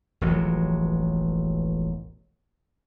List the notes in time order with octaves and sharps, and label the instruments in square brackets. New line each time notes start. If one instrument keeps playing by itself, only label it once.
[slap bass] E1 A1 F3 F#3